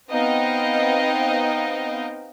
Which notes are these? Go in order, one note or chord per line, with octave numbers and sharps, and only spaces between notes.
B3 C4 D#4 D#5 F5 G5